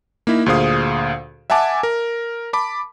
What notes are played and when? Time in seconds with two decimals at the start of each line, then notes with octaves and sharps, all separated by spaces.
0.27 A#3 D#4 E4
0.46 D2 A#2 G#4 C5 F5 D#6
1.50 E5 F#5 G#5 A5 D6
1.83 A#4
2.53 A5 B5 D6